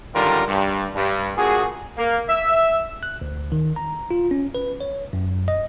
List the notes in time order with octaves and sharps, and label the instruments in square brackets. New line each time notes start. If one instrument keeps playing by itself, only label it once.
[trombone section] F#2 D3 D#3 G3 F4 A#4
G2
G2
G2 A#2 F#4 G#4
[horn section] A#3
E5
[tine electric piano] F#6
D2
D#3
A#5
F4
C#4
B4
C#5
F#2
D#5